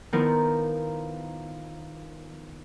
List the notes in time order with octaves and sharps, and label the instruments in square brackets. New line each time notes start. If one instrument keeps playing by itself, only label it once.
[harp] D#3 F3 B3 E4 F4 A#4